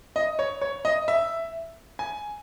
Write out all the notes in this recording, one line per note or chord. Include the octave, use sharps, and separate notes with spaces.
D#5
C#5
C#5
D#5
E5
G#5